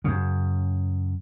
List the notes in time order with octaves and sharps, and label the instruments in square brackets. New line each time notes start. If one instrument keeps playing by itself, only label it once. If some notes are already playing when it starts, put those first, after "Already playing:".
[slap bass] F#2 C#3